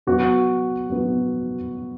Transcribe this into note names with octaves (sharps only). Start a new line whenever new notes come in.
F#3 B3 F#4
F#3 B3 F#4